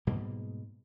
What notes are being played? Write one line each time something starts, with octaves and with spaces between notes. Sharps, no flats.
G#2 B2 G3 A#3